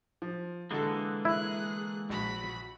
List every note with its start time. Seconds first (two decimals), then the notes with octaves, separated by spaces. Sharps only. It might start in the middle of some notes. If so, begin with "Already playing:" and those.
0.22 F3
0.71 D3 E3 G#3 A#3 F#4 A4
1.25 E4 G#4 F#6
2.10 A#1 F#4 B5